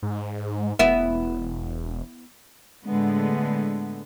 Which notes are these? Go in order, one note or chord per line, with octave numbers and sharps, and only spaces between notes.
G#2
E1 B3 E4
A2 D3 G#3 B3